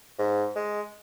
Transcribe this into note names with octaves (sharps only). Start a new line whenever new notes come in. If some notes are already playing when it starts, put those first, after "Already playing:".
G#2
G#3